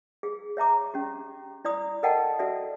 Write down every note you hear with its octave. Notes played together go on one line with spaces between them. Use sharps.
G#4
C#5 E5 A#5 D6
C#4 G4
E4 D5 B5 D#6
A4 A#4 D#5 F#5 G5 A5
F#4 A4 D5 E5